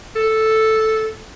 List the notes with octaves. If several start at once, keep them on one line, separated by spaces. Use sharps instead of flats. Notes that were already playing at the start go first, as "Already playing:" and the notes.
A4